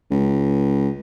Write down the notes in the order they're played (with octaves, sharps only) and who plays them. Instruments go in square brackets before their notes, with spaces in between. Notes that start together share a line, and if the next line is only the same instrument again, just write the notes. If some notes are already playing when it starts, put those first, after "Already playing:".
[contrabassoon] C#2